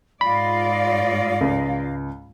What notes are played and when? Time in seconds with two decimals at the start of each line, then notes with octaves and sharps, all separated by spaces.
0.21 G#2 F4 D5 D#5 F5 B5
1.41 C#2